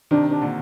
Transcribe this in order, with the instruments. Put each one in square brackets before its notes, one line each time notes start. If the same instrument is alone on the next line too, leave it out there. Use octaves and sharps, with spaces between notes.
[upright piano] C3 D#3 [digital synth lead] D4
[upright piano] C3 [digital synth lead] D4
[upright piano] A#2 D3